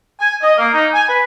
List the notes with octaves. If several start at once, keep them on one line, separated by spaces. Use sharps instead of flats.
G#5
D#5
A#3
D#4
G#5
B4